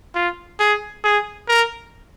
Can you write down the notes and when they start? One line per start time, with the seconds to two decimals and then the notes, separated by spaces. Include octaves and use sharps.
0.15 F4
0.60 G#4
1.04 G#4
1.48 A#4